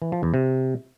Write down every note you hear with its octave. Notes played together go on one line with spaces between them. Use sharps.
E3
F3
E2
C3